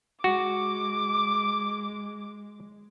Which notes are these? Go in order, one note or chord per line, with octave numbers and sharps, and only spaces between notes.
G#3 F#4 D6